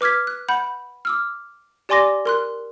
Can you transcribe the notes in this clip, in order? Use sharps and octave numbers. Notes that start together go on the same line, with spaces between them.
B4 D6 F6 G#6 B6
F#6
F#5 B5 G6
D6 E6 F6
G4 D5 G#5 C6 D6 A#6
A#4 C6 F#6